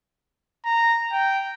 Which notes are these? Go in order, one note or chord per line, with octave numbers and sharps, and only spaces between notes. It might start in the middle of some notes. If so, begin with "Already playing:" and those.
A#5
G5